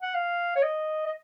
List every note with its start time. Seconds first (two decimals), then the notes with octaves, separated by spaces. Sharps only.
0.02 F#5
0.15 F5
0.55 C#5
0.63 D#5
1.06 D#5